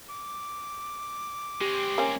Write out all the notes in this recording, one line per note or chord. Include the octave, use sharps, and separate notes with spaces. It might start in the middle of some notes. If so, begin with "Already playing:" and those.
D6
G#3 C4 G4
A#3 C#4